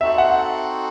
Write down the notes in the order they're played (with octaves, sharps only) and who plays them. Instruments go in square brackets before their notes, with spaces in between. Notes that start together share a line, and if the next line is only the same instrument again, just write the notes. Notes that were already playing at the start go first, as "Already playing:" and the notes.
[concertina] C4 D#4 F#4 A4 C5 [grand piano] E5
[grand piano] F#5